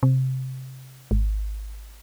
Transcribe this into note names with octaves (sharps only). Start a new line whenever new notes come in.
C3
G#1